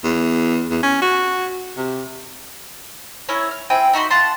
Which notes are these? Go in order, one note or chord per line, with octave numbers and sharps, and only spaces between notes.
E2
E2
C#4
F#4
C3
C#4 E4 A#4 C#5
F6
C4 E4 G5 G#5
D#4 F#4 B5 C6
F5 F#5 A5 C6